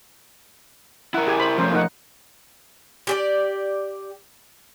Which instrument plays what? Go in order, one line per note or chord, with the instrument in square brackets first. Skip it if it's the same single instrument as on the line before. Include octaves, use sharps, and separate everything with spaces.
[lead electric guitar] E4 A#4 [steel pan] F#5
[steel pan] G4 G#4 G#5
C5 B5
[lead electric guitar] F3 A3 [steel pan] C#4 A#4 C5
[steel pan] A#3 D#4 F#5
[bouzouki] G4 G#4 D5